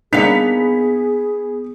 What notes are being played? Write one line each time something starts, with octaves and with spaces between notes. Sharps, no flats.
A#3 B3 D4 D#4 G#4 F5 B6 F7